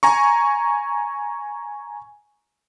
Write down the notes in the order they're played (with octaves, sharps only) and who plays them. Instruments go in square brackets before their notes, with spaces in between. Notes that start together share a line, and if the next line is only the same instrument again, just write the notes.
[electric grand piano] G#5 A#5 C#6